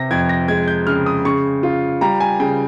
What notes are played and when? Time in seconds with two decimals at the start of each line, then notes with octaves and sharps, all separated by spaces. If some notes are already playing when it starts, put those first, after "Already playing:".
Already playing: C3 A#6
0.10 F2 G#6
0.29 A#6
0.48 G#3 G#6
0.68 G6
0.87 C#3 F6
1.06 D#6
1.25 C#3 C#6
1.63 F4
2.01 G3 A#5
2.20 G#5
2.40 C#3 G5